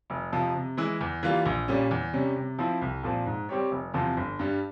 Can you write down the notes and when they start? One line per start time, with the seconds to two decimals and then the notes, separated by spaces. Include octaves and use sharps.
0.10 F1
0.33 F2 C3 F3
0.55 C3
0.77 E3 G#3 E4
1.01 E2
1.23 E3 G3 A#3 F4
1.45 A#1
1.68 A#2 G3 C#4
1.91 E2
2.13 C3 G3 C#4
2.36 C3
2.59 F3 C4 E4
2.81 C2
3.03 A#2 F3 C4
3.26 G#2
3.49 G3 C4 G4 C#5
3.71 F1
3.94 E2 C3 F3 C4
4.17 G1
4.39 G2 G3